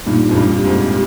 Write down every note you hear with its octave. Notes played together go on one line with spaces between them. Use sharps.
G2 A#2 D#4
F2
G2
G4
F2 G#2